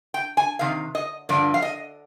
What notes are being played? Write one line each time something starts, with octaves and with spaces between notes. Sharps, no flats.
G5
G#5
C3 D#3 F5
D#5
G2 D3 F3 D5
F5
D#5